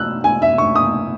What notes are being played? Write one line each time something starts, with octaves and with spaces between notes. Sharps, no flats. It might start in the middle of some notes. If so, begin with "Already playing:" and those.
Already playing: B2 E6 F#6
G#5
E5
C#6
D#6